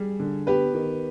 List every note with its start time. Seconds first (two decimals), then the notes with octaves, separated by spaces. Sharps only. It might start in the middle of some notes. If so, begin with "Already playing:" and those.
Already playing: G3 G#4
0.20 D3
0.47 B3 G4 B4
0.74 D#3